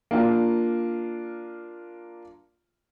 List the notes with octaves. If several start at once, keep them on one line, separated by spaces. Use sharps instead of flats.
A#3 D4 F4